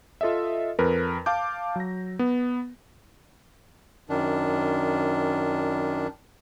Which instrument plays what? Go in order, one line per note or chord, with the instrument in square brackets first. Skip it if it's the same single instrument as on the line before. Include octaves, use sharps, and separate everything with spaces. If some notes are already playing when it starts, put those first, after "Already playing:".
[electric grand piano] F4 A4 D#5 E5
F2 A#4 B4
F5 A5 D6 G6
F#3 A#6
B3
[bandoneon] F#2 D#3 D4